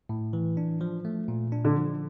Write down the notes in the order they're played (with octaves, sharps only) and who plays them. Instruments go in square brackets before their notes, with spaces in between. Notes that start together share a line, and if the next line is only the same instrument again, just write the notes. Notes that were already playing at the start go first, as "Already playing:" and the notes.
[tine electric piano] A2
E3
D4
F3
A3
A#2
D4
[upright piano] D3
[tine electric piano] F3